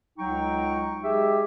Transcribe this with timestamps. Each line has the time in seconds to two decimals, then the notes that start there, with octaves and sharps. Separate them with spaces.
0.18 C#2 F#3 D#4 G5 C#6
1.03 G#3 G4 G#4 E5